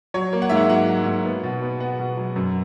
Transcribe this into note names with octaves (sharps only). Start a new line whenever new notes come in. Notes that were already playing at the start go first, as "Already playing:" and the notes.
F#3 C#5
A#3
F#5
G#2 E5
F#5
F#3 F#5
F#3
G#2
B3
B2
B3
B3 F#5
B2
F#3
F#2